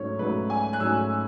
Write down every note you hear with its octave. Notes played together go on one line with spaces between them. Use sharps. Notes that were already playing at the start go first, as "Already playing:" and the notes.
Already playing: G#2 F#3 A3 C#4 C#5
G#2 F#3 A3 C#4 B4
G#5
F#6
G#2 F#3 A3 C#4 E6